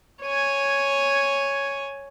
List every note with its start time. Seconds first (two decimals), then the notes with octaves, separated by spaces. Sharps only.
0.22 C#5 G#5